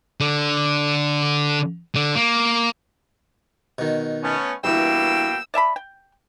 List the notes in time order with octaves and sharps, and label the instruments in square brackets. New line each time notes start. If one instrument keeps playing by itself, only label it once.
[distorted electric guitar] D3
D3
A#3
[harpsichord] B2 D#3
[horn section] A3 B3 C#4
[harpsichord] G2 E3 [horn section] B2 A#3 G5 [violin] E6
[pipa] D5 E5 A5 B5
G5